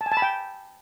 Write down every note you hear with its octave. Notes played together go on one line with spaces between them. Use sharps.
A5
G#5
A5
B5
G5